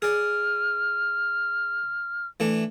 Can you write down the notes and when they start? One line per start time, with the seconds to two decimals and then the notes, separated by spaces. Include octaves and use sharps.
0.02 G#4 D5 F6
2.40 E3 A3 D4